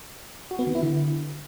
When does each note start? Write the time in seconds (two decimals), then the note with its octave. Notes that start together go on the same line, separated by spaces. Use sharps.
0.51 F#4
0.59 B3
0.67 D#3
0.75 E4
0.83 D3